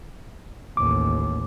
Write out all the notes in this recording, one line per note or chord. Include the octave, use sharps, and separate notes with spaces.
A1 D#2 D6